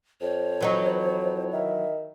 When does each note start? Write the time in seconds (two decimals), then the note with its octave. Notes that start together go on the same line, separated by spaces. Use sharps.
0.21 F2 C5 C#5
0.61 E3 F#3 D#4
1.52 D#3 E5